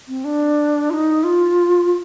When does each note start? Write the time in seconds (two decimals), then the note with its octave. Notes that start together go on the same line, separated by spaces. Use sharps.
0.08 C4
0.25 D4
0.90 F4
0.94 D#4
1.24 F4